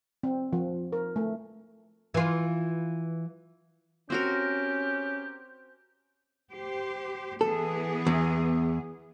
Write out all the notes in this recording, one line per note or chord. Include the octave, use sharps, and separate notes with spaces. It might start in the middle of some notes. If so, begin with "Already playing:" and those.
C4
F3
A#4
A3
E3 F4
C4 C#4 F#4 G4 A#4
G4 C5
E3 B3 G#4 A4
E2